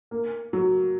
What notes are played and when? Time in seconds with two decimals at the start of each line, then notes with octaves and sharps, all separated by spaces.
0.11 A#3
0.53 F#3